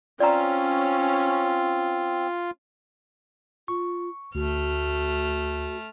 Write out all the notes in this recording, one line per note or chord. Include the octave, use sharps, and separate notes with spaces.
C4 C#4 F4 D5 A#5
F4 C#6
D2 A3 F#4 F6